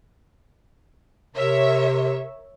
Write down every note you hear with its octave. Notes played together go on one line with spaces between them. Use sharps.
C3 A#4 C#5 E5